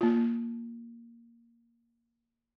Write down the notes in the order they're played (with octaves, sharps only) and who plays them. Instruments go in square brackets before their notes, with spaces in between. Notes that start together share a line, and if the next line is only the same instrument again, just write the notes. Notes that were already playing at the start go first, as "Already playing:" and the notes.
[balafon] A#3 F4